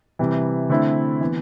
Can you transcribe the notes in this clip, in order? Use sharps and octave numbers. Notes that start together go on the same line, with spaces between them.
C3 E3 G3
D3 A3 C4 E4
E3 B3